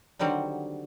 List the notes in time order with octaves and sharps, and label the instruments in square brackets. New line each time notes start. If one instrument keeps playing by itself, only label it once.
[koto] D3 D#3 F#3 G3 C4